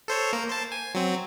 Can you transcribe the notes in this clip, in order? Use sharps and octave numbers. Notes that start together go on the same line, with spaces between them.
A4 C5 C#5
A#3 A#4
C5 A5
G#5
F#3 C4